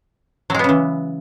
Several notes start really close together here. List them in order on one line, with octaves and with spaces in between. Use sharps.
F#3 G#3 B3 C#3 E3